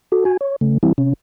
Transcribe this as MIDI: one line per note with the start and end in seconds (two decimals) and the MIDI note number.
0.12 0.24 66
0.12 0.24 69
0.25 0.37 66
0.25 0.37 80
0.41 0.56 73
0.61 0.78 49
0.61 0.78 57
0.83 0.92 52
0.83 0.92 55
0.83 0.92 60
0.83 0.92 64
0.98 1.13 48
0.98 1.13 61